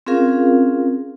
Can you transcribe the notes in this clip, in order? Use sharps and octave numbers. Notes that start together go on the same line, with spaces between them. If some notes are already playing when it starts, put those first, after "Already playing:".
C4 C#4 F4 G#4 A#4 F5